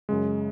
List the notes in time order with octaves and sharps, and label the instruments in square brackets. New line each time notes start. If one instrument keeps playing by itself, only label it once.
[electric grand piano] F#2 C#3 G#3